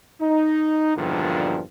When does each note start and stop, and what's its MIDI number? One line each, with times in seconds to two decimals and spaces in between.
0.21 0.95 63
0.96 1.62 40
0.96 1.62 43
0.96 1.62 46
0.96 1.62 50
0.96 1.62 51
0.96 1.62 53